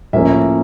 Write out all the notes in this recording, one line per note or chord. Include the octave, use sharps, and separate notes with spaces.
A2 F3 A#3 C#4 E5